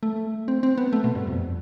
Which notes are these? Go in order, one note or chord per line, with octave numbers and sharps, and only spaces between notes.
A3
C4
C4
B3
A3
B2
G2
F2